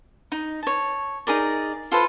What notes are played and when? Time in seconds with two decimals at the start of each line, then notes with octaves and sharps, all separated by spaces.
0.32 D#4
0.63 C#5 A5
1.27 D#4 G#4 A#4 D5
1.91 F4 A4 B4 C5